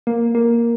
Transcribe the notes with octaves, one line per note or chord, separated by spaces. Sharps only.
A#3
A#3